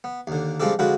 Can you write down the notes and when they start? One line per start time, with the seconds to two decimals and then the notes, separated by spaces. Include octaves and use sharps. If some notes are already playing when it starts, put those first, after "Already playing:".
0.04 B3
0.27 D#2 D3
0.60 F3 G3 G#3 C4 D4 A4
0.79 D3 F3 G#3 F#4 B4